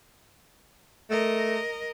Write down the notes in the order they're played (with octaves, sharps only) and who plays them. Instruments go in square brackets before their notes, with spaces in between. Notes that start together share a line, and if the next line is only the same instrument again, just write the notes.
[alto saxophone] A3 [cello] A#4 D#5